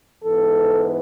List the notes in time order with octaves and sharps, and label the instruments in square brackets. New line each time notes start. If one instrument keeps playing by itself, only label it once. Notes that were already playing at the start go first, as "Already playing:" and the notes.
[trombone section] G#2 E3 B3 A4